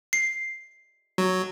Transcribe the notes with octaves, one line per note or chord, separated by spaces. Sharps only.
C7
F#3